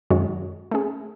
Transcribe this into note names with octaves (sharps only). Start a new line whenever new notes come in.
F#2 D#3 G#3 C#4 F#4
A3 C#4 G#4